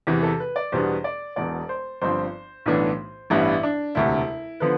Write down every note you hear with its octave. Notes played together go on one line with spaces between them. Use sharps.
E2 C3 E3
A4
B4
D5
E2 B2 G3 B3 D4 C5
D5
E1 E2 B2 D5
C5
G1 G2 F3 C4 C5
B1 A2 E3 B3 D4
A1 G2 E3 G3 B3 E4
D4
E1 D2 C3 E4
D3 F3 B3 B4